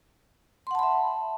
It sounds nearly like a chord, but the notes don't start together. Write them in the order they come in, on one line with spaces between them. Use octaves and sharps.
C6 F#5 A5 B5 E5